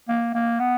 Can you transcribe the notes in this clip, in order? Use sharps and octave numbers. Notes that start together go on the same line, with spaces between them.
A#3
A#3
B3